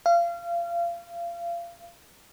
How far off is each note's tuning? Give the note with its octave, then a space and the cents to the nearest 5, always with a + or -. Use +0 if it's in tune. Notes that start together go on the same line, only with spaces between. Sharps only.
F5 -30